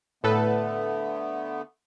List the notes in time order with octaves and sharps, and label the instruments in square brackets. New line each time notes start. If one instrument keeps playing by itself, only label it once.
[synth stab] A2 A4 B4 [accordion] D3 A3 B3